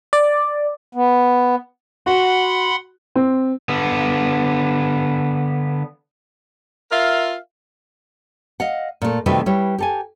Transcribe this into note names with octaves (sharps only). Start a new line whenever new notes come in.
D5
B3
F#4 F#5 B5 C6
C4
D3 B3
F4 A#4 E5 F5
D#5 F5 F#5
A#2 A3
C3 D#3 G3 A3 F#4 B4
G3 E4 B4 C#5
G4 A4 G#5